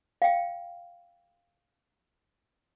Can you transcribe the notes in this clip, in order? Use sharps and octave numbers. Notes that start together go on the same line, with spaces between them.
F5 G5